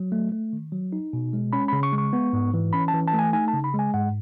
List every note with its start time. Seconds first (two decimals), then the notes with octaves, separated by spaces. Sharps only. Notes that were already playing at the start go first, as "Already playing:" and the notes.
Already playing: F#3
0.12 A3
0.32 A3
0.53 D#3
0.72 F#3
0.93 D#4
1.13 B2
1.33 G#3
1.53 C#4 B5
1.68 C#3 B5
1.83 C#6
1.92 G#3
1.98 C#6
2.13 B3
2.33 G#2
2.54 E3
2.73 C#4 B5
2.88 A5
2.93 E3
3.08 A5
3.13 A3
3.19 G#5
3.33 D#4 G#5
3.48 A5
3.53 C#3
3.64 B5
3.74 G#3
3.79 G#5
3.94 G#2 F#5